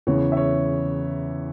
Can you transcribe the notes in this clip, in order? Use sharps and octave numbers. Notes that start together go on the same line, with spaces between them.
E2 C#3 E3 C#5
E5
C#5